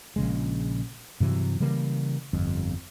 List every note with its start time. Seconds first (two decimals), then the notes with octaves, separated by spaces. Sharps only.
0.16 A#1 C#3 G#3
1.20 G2 C3 E3 F#3
1.60 C#3 E3 G3 A#3
2.33 G1 F2